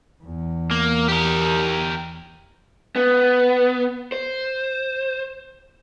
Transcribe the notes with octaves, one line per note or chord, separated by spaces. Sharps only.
E2
A#3
G4 A#4
B3
C5